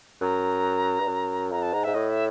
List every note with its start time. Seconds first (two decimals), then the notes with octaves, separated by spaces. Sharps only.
0.21 F#2 A#5
1.00 G2
1.08 F#2
1.51 F2 A#5
1.62 A5
1.73 G#2 A#5
1.84 G#2 E5
1.94 A2 D#5
2.09 E5